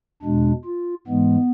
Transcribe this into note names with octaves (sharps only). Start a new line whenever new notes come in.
E2 B2 G#3 D4
F4
G#2 E3 G#3 B3